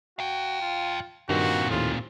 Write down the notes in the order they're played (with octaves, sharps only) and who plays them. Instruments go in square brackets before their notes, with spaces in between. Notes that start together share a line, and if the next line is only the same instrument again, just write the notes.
[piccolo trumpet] F#4 [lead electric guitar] F5 G5
[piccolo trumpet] F4
[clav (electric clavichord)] G2 D#3 F4 [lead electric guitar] A#2 C4 [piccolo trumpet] F#4
[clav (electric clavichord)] D#2 A2 [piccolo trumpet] F4